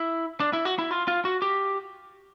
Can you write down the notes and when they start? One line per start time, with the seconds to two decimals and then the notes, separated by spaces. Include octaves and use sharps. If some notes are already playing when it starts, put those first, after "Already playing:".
Already playing: E4
0.40 D4
0.53 E4
0.65 F#4
0.79 E4
0.91 F4
1.08 F4
1.25 F#4
1.42 G4